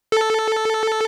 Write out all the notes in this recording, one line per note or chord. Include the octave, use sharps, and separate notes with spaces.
A4